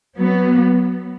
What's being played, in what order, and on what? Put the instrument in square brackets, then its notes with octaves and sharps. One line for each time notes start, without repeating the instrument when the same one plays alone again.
[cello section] F#3 B3